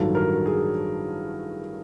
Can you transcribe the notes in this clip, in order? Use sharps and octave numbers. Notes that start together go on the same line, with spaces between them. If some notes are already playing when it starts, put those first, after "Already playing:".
Already playing: A1 G2 D#3 F#3 A4
A#4
G#4